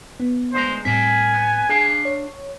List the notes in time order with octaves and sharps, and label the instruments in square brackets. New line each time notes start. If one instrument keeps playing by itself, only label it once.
[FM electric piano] B3
[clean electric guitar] D2 G#3 A#5 [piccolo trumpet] C5
[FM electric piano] A2 G3 C4 [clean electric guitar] A#4 E5 [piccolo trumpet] G#5
[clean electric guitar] B3
[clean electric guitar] D4 F5 [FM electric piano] G#4
[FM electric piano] C#5